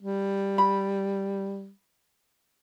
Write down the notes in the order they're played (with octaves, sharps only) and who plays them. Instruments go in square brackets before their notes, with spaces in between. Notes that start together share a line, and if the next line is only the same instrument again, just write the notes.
[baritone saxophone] G3
[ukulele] B5